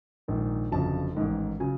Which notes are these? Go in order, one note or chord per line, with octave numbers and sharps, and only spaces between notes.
A#1 G#2 D#3
G1 F2 C#3 F#3 A5
A1 G#2 D#3
C#3 F#3 G#5